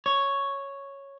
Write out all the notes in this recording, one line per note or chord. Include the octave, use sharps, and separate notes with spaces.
C#5